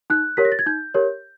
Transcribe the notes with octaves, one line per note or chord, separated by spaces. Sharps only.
D#4 F#6
G4 A#4 C#5 B6
A#6
A6
G#6
D#4 G6
G4 A#4 C#5